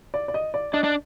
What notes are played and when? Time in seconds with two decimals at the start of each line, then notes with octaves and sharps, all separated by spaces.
0.14 D5
0.28 D5
0.34 D#5
0.54 D5
0.73 D4 D#5
0.84 D4